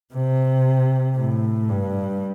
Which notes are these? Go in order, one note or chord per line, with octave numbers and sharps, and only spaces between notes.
C3
A2
G2